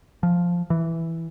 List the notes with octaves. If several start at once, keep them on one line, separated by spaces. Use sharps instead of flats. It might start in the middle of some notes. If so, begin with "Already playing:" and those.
F3
E3